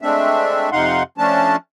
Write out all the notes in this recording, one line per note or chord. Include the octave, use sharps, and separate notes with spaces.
G#3 A3 C4 D4 E5
F2 C3 D#4 F5 F#5 C6
F3 A3 C#4 D4 A5